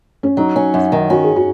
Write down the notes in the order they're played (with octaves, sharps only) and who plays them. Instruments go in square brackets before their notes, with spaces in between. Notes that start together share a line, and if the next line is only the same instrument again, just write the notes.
[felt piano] C#4
[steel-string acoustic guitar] F#3 [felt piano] D#4
[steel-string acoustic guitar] C#4
F#2
D#3
[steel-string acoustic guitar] C#4 [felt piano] F#4
[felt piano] G#4
F#4